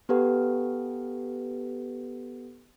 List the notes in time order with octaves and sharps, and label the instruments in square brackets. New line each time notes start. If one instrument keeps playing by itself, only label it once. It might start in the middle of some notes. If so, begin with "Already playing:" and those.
[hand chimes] B3 G4 A4 B4 F#5